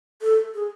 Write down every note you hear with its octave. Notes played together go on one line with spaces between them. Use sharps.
A4
G#4